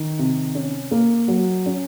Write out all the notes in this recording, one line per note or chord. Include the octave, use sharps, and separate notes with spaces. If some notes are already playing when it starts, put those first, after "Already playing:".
Already playing: D#3
C3
C#4
A#3
F#3
C#4